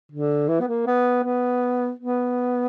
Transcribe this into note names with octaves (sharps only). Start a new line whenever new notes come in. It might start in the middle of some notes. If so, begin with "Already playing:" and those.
D3
E3
B3
A#3
B3
B3
B3